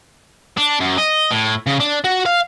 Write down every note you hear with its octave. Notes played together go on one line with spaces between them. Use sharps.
D4
F#2
D#5
A2
C#3
D4
F#4
F5